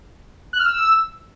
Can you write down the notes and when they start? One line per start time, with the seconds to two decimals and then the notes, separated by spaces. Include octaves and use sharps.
0.53 F#6
0.59 F6
0.66 E6